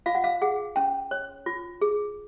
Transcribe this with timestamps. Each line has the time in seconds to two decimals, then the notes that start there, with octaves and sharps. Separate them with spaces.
0.06 F4 F5
0.15 F#5
0.24 F5
0.42 G#4 F#5
0.76 C#4 G5
1.11 C#5
1.46 F4
1.81 G#4